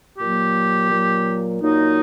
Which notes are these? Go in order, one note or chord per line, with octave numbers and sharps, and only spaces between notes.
A#2 F#3 A#3 G4
A#2 F#3 A#3
A#2 F#3 A#3 D#4